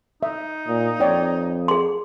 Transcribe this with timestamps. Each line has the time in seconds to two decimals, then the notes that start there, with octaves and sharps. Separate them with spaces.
0.23 D#4 E5
0.68 A#2
1.00 F2 C#5 D5 G5
1.68 G#4 C6